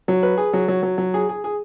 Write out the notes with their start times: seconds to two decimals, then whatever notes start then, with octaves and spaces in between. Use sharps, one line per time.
0.08 F#3
0.23 B4
0.37 G#4
0.53 F#3
0.68 F#3
0.83 F#3
0.98 F#3
1.14 G#4
1.29 G#4
1.44 G#4